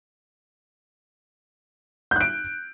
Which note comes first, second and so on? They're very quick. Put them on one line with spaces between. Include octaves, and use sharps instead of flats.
G6 F#6 D7